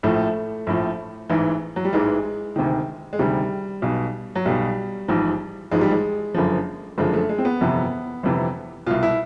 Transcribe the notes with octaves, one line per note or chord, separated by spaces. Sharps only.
A#1 A2 F3 A3
A#1 A2 F3
A1 G#2 E3
F#3
G3
A1 G#2 E3 G#3
D2 C3 D#3
G#3
D2 C3 D#3 G3
B1 B2
F#3
B1 B2 G3
A1 G#2 F3
A1 G#2 F3 G#3
G3
G#3
F#1 F#2 D3 F3
F#1 F#2 D3 F3 G#3
A3
G#3
C4
B3
G1 F2 C3 E3
G1 F2 C3 E3
C2 B2 F4
E4